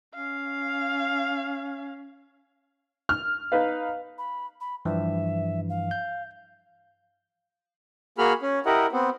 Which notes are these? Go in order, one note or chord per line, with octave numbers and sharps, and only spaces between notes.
C#4 F5
F6
D#4 B4 F5
B5
B5
G2 E3 F3 E5
F5
G6
A#3 F#4 G#4 B5 F6
C#4
E4 G4 A#4 D#5 F#5
B3 C4